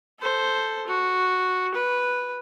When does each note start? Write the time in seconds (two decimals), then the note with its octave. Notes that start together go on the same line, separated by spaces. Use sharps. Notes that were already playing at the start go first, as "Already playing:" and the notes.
0.20 A4 C5
0.87 F#4
1.74 B4